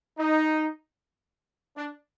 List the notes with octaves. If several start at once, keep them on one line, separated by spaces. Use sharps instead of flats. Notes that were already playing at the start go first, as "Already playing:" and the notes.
D#4
D4